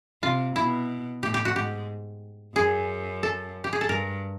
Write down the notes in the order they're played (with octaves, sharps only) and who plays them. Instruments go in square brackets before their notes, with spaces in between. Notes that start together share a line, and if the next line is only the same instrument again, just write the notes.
[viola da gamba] C3 [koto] F4
[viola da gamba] B2 [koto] E4
[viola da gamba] A2 [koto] G4
[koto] G4
F#4
[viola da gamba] G#2 [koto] G4
[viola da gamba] F#2 [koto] G#4
[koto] A4
G4
G#4
A4
[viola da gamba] G2 [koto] A#4